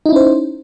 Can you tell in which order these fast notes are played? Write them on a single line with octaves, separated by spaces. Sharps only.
D#4 E4 C#4 C5